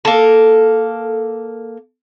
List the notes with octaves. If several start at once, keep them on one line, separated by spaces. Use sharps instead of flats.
A#3 A4